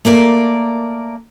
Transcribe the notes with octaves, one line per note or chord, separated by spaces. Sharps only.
A3 A#3 A#4 D5